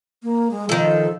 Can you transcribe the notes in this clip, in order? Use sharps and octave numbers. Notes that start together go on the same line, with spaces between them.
A#3
G#3
D#3 F3 A4